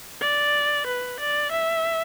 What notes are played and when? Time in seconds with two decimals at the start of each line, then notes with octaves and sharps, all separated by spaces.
0.21 D5
0.86 B4
1.20 D5
1.52 E5